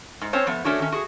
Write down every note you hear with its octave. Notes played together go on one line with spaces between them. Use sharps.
G#2
C4 C#4 C5 C#5 A5
F3 A3 B3
A3 C#4 D4 F#4 C#5
D#3 C#4
F#4 G#4